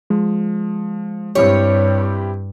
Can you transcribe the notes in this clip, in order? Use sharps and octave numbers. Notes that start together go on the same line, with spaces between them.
F3 G#3
G2 C4 E4 G4 C#5